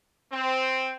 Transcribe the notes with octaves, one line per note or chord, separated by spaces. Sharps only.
C4